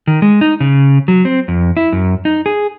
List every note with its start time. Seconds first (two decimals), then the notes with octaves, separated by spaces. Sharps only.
0.07 D#3
0.22 G#3
0.41 D#4
0.60 C#3
1.08 F#3
1.25 C4
1.48 F2
1.77 E4
1.92 F#2
2.25 D#4
2.46 G#4